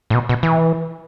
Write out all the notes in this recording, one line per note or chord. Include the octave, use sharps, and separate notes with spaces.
A2
B2
B2
E3